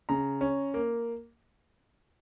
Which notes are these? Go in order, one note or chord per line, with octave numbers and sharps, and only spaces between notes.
C#3 A#5
C#4
A#3